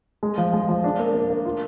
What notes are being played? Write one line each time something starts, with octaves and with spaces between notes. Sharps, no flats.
G#3
F3
G#3
F3
D4
A#3
A#3
A#3
F4